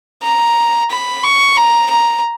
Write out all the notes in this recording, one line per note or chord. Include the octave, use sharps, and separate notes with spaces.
A#5
B5
C#6
A#5
A#5